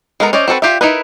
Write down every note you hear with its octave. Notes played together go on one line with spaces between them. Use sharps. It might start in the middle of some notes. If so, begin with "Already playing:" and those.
G#3 B3 A4 A#4 A#5
C#4 C5 D5 D#5
C4 F#4 A4 B4
F4 G4 D5 E5
D#4 E4 A#4 B4